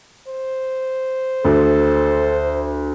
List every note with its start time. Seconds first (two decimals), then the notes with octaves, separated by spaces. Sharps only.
0.28 C5
1.45 D2 A4